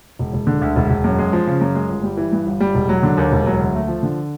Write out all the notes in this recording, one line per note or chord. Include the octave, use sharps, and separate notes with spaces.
E1
E1
D3
D2
E1
E1
F#2
G#3
F3
C#3
F#2
G#3
G1
G3
E3
G2
G1
G3
E1
F#3
D3
D#2
E1
F#3
D2
A3
F3
D3